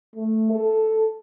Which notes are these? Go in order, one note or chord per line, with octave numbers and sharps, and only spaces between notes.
A3
A4